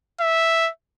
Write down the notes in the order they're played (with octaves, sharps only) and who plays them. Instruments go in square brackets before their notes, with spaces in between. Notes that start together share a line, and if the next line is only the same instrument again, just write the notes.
[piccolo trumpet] E5